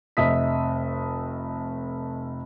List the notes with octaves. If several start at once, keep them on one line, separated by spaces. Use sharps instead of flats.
F1 D#5 E5 D#6 B6